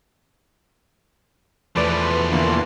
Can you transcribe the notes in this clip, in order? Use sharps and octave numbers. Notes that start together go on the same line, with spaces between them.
E2 B2 F3 A3 B4 D5 A5 C6
D3 E3 A#3